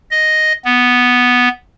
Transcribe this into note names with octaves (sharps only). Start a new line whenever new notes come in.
D#5
B3